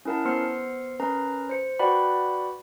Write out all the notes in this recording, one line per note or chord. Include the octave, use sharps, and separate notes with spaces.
C#4 E4 A#4 F#5 A5
B3 C5 C6 F6 C7 C#7
C#4 A#4 B4 A#5
C5 C#7
F#4 B4 D5 F#5 G5 B5